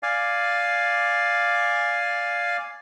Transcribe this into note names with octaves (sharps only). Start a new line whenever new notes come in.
D5 F5 G#5